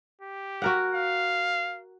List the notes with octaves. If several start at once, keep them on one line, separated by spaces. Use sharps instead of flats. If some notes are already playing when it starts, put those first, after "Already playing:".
G4
F#4 A#4 F#5
F5